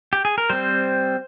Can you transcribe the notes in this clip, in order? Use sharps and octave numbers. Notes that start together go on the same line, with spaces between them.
G4
G#4
A#4
G3 C4 C5